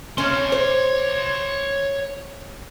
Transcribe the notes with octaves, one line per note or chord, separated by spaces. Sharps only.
C#4 C#5 C6
C5